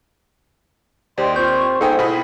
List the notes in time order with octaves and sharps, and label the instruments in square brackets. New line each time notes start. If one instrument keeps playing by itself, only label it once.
[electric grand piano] D#2 [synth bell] G4 C5 D5 [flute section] D#5 G5 C6
[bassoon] C4 [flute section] F4 C#6 [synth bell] G6
[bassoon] G#2 [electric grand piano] B3 D#4 G#5 [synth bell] A4 G5 [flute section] D#6
[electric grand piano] B2 G#4 B5 [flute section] E4